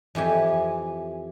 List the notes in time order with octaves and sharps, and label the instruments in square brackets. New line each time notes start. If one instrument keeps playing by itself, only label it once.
[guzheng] F2 E3 G4 G#5